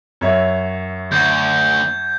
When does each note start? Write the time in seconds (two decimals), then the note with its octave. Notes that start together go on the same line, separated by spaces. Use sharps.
0.21 F#2 C#5 E5
1.12 D2 G6 G#6